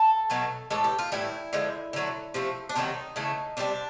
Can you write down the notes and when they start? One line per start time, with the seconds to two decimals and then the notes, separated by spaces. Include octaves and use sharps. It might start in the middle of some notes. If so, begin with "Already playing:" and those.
Already playing: A4
0.30 B2 F#3 A3
0.70 A2 E3 G#3 A4
0.84 G4
0.99 F4
1.12 A2 E3 G3 E4
1.53 D3 F3 G#3
1.93 D3 F#3 A3
2.34 C3 F3 A3
2.69 D4
2.76 C3 D#3 F#3 A3 D#4
3.16 C#3 E3 A3
3.57 C3 D#3 G3 D4